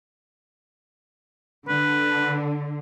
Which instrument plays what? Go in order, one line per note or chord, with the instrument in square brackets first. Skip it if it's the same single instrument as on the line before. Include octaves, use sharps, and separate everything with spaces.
[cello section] D3 [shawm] B4